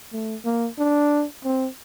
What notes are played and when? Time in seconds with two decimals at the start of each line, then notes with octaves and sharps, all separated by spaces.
0.13 A3
0.45 A#3
0.78 D4
1.45 C4